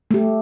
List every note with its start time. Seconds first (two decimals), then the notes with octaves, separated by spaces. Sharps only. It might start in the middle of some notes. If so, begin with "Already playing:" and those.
0.11 A3 G4